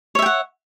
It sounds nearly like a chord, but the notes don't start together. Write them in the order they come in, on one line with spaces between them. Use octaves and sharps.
C#5 E5 G5 F#5